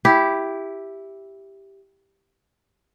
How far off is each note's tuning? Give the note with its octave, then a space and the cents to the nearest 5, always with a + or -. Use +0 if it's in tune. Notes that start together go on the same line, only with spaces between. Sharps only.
E4 +0 G4 +0